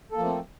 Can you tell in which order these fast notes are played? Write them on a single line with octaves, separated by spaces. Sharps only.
A4 A#3 F3 A3 C4